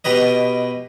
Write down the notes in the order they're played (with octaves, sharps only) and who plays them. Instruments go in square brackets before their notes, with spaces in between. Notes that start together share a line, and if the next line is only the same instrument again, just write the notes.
[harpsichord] B2 G4 B4 D#5